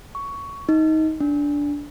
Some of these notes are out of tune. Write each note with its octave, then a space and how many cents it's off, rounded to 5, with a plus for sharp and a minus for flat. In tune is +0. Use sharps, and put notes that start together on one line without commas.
C#6 +10
D#4 +20
D4 -15